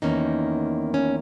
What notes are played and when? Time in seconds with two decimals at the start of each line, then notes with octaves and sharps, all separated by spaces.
0.02 E2 D#3 A#3 C#4 D#4
0.94 C#4